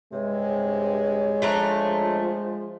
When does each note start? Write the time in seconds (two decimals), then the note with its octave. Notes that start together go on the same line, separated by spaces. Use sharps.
0.12 G2 C3 G#3 C#5
1.42 F3 A3 D4 A#5